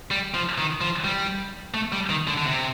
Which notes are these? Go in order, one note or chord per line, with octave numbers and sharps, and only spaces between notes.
G3
F3
D#3
F3
G3
A3
G3
D#3
D3
D3
C3